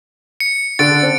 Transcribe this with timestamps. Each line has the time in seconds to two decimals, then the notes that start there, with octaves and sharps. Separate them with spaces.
0.40 C#7
0.79 D3 A6 D7
1.03 C4